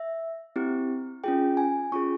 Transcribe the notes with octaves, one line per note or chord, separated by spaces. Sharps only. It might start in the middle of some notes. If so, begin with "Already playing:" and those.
Already playing: E5
C4 E4 G4
C#4 F4 G#4 G5
G#5
C#4 F4 G#4 C#6